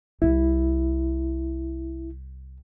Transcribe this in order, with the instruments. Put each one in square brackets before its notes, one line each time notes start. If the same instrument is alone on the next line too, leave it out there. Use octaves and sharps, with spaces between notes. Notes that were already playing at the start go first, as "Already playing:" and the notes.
[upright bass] C2 [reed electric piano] E4